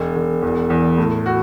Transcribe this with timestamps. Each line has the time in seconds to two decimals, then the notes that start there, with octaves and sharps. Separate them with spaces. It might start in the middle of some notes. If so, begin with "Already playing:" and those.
Already playing: E1
0.16 E1
0.42 E2
0.70 E2
0.98 A2
1.26 F#4